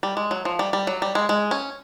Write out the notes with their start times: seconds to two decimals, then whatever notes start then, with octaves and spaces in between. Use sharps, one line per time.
0.03 G3
0.17 G#3
0.31 F#3
0.45 F3
0.59 G3
0.73 G3
0.87 F#3
1.02 G3
1.15 G#3
1.29 G#3
1.51 C#4